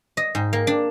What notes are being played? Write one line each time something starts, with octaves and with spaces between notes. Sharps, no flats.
D#5
G#2
A#3
D4